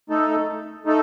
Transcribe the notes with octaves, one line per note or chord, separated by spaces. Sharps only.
A3 D#4 A4
A3 D#4 A4